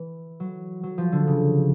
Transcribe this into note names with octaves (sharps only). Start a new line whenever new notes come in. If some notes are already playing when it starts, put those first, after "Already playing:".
Already playing: E3
F#3
F#3
F3
D3
C#3